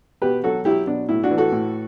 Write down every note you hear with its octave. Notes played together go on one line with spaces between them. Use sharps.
B2 G4 B4
F#3 F#4 A4
F#3 E4 G4
B2 D4
A2 E4
D4 F#4
E3
F#4 A4
A2